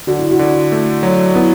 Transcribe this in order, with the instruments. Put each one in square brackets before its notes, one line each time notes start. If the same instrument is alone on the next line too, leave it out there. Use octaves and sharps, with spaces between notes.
[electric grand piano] D3 [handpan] F#4
[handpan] E4
F#4
[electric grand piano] D3
A3
F#3
[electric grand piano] B3 [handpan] E4